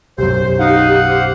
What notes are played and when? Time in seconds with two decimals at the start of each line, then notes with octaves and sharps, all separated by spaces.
0.18 B1 F#2 G4 C5
0.59 D#4 F5 F#5
1.08 G4 C5